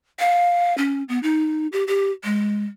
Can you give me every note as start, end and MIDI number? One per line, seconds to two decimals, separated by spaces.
0.19 0.76 77
0.78 1.03 61
1.09 1.21 59
1.23 1.67 63
1.72 1.84 67
1.88 2.11 67
2.24 2.64 56